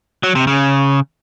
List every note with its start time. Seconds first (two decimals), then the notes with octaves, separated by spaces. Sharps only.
0.23 F#3
0.35 C3
0.47 C#3